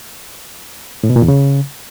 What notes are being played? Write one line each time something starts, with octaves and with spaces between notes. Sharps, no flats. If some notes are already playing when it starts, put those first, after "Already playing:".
A2
B2
A#2
E2
C#3